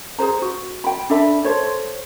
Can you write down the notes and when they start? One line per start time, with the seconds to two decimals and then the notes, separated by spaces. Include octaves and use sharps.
0.18 G#4 B4 C5 A#5
0.42 F#4
0.84 G5 B5
1.10 D4 A4 E5 B5
1.45 A4 C5 C#5